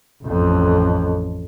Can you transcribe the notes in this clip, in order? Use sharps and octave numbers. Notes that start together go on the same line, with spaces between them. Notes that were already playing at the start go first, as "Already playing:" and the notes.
A1 F2